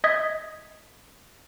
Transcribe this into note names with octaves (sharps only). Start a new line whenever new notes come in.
D#5 E5 D#6 G#6 B6